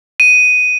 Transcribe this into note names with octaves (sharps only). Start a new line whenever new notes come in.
D#7